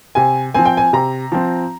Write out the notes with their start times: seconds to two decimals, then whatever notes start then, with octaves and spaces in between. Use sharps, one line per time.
0.15 C3 G#5
0.54 F3 C4 G#5
0.65 G5
0.77 G#5
0.93 C3 A#5
1.32 F3 C4